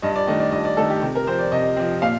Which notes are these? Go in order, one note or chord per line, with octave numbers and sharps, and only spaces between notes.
G2 D#5
D5
D#3 A3 D4 D#5
D5
G2 D#5
D5
D#3 A3 D4 A4
G4
C3
A#4
F3 C4 C5
D5
C3 D#5
F3 C4
A#2 F5